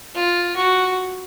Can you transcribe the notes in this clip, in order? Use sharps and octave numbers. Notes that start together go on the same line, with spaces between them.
F4
F#4